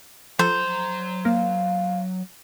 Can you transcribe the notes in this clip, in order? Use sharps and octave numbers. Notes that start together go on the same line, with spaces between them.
F3 F#3 A4 C5 A#5
A#3 A#4 F5